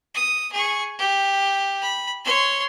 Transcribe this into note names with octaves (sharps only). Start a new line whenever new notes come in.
D#6
G#4 C#6
G4
B5
C#5 C6